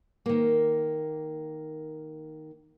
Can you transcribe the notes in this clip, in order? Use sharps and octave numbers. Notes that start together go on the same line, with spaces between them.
D#3 A#3